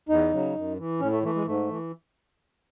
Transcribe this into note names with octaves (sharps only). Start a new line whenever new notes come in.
E2 D#4
C#3 F#3
F#2
E3
A2 C#4
A3
E3 A3
G#3
G#2 A3
E3